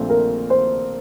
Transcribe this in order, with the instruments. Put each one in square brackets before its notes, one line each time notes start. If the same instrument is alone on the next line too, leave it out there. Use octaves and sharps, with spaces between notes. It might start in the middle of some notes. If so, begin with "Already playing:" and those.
Already playing: [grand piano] A#1 A#2 A3 C4
[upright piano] A#4
C5